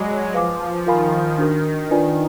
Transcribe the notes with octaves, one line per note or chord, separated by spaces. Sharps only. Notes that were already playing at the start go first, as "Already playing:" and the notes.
Already playing: F#3 G#3 G#4 D5 G#5 B5 D6
F3 B4 F5 G#5 D6
D#3 F4 A#4 F5 G#5 B5
D#3 D4 F#4 A#4
D4 F4 B4 D5 G#5